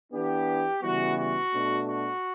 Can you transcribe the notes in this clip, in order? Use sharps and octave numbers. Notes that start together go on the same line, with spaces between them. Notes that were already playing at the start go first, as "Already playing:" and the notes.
E3 B3 D4 G4
C#3 E3 G3 B3 F#4
F#4
B2 A3 D4
F#4